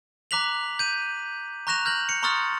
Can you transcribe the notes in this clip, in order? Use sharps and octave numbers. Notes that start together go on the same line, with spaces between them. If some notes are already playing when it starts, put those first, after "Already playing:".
A#5 D6 F#6 B6 F7 F#7
G6 D#7
A#5 C#6 F#6 A#6 E7 F7
F6 G6 A#6 F#7
C#7
A#5 C6 C#6 D#6 F6 A6